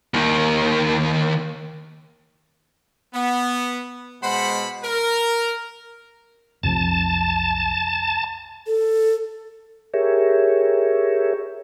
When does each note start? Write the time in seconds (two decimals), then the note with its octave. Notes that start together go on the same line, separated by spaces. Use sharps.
0.14 D#2 D#3
3.13 B3
4.22 B2 G#3 C5 F#5 B5
4.83 A#4
6.63 B1 F2 C3 F3 A5
8.67 A4
9.94 G4 G#4 A#4 C#5 E5